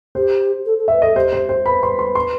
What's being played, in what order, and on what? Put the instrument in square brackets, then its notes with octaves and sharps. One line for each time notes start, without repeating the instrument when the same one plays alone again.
[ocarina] G4 [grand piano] C5
[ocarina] A4
A4
[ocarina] B4 [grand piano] E5
[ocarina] A4 [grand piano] D#5
[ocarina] G4 [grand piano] C5
[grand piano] C5
C5
[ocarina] B4 [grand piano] B5
[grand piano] C6
C6
C6